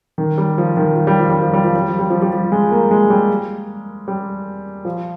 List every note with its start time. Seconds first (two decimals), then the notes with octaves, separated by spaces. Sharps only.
0.18 D#3
0.38 G3
0.58 F3
0.77 D#3
0.96 F3
1.07 G3
1.20 F3
1.30 G3
1.42 F3
1.53 G3
1.64 F3
1.76 G3
1.88 F3
1.99 G3
2.10 F3
2.22 G3
2.33 F3
2.52 G#3
2.71 A#3
2.91 G#3
3.10 G3
4.08 G3
4.85 F3